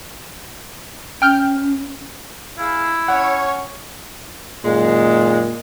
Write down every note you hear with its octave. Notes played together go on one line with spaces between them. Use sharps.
C#4 G5 F6 G6
E4 G#4 F5
C#4 C#5 F#5
F#2 A#2 D#3 G#3